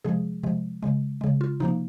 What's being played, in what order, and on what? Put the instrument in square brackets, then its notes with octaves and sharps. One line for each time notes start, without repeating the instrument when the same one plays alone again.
[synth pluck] C3 F3 G#3 G#4
C3 F3 G#3
C#3 G#3
C#3 G#3
F4
C3 F3 A#3 D#4